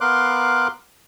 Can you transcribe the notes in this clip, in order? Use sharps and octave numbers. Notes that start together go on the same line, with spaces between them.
B3 A#4 F5 C6 D6 F#6